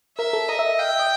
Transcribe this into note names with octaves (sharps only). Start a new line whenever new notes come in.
A#4 E5
A4
A#4 D#5
E5
E5
F5 G5
E5
D#5